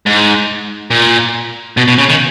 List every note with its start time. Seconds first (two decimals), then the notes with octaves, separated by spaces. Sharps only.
0.06 G#2
0.91 A#2
1.77 B2
1.88 B2
1.98 C#3
2.09 D#3